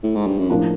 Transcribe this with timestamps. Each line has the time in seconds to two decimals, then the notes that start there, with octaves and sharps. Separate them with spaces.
0.03 A2
0.15 G#2
0.27 G2
0.38 F#2
0.50 F2 A2 F3 A#3 D4